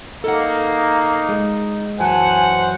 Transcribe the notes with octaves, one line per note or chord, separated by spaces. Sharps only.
A#3 D#4 A4 F#5
G#3
F#2 E3 F#3 C5 F#5 G#5 A5